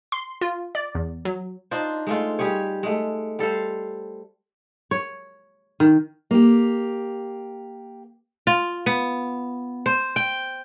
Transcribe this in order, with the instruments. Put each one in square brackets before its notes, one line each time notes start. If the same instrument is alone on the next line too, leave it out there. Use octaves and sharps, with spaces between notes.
[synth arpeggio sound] C6
F4
D5
E2
F#3
[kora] D4 D#4 F4 C5
G#3 A3 F4
G3 G4 G#4 C#5
G#3 A3
G3 A4 C5 F5
C#5
D#3
[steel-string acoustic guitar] A#3 G4
[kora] F4
B3
C5
G5